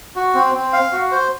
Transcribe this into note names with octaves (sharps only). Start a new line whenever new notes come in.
F#4
C4
C4
F5
F#4
C5